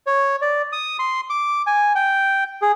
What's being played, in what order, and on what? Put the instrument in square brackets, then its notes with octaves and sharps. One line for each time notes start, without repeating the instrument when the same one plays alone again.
[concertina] C#5
D5
D#6
C6
D6
G#5
G5
G#4